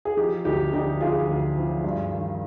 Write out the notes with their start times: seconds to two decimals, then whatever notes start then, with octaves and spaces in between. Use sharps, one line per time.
0.05 G#4
0.17 F3 D#4 G4
0.45 D2 D#4 G4
0.73 D3 D#4 G4
1.00 F3 F4 G#4
1.29 D2
1.56 F3
1.84 G2
2.12 D#3